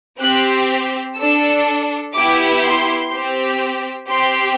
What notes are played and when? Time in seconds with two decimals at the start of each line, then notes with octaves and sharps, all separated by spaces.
0.20 C4 G4 F#6
1.17 D4 A4 E6
2.15 B3 E4 G4 D6
2.63 C6
3.11 C4 G4
4.09 C4 G4 C6